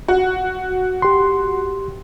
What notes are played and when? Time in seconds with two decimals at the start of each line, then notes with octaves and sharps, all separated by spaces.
0.08 F#4
1.02 G4 C6